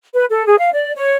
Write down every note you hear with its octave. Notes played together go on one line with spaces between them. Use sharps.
B4
A4
G#4
F5
D5
C#5